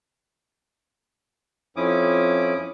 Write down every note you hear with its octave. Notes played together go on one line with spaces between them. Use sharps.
F2 F3 C#4 E4 D6 D#6